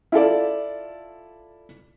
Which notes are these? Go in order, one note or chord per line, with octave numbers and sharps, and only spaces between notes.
E4 F4 A4 D5